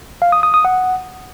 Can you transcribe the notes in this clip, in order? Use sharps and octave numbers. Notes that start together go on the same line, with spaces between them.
F5
D#6
D#6
D#6
F#5